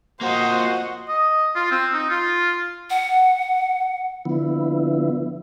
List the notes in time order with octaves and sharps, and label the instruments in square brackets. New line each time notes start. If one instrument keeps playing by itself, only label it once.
[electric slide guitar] A#3 C4 F4 [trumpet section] F#4 [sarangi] C5 [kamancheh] D#5 F#5
[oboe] D#5
F4
C4
D#4
F4
[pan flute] F#5
[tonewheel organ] D3 F3 B3 E4